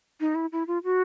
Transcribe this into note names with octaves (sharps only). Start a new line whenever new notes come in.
D#4
E4
E4
F4
F#4